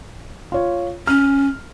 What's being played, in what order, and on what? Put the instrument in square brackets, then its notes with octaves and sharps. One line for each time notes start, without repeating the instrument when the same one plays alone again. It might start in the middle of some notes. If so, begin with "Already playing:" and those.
[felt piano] F4 C#5
[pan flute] C#4 [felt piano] F6